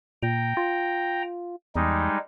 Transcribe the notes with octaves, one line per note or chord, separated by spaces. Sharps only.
A#2 G5 A#5
F4
E2 G3 G#3 D#4